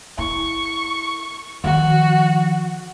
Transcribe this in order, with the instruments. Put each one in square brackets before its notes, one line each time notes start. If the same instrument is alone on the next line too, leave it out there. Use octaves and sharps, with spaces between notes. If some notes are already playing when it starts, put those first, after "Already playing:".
[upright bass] E4 [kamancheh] C#6
[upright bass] D#3 F3 [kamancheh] F#4